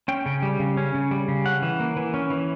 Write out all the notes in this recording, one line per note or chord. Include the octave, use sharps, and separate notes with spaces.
C#4 G5
C#3
G3
C#3
C#4
C#3
G3
C#3
C#4 F#5
E3
A#3
E3
C#4
E3